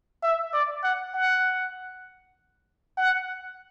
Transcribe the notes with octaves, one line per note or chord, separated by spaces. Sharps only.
E5
D5
F#5
F#5
F#5